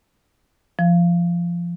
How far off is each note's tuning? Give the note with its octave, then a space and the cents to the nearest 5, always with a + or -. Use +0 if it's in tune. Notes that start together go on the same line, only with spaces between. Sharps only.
F3 -20